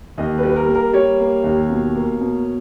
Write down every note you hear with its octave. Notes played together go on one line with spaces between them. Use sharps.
D#2 D#5
B4
G3
B4
A#4
A#3
A#4
G3 C#5
A#3
D#2
B2
A#3
B2